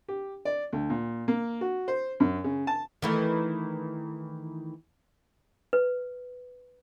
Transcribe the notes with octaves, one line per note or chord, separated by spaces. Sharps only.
G4
D5
D2
A#2
A#3
F#4
C5
F#2
C#3
A5
D#3 E3 A3
B4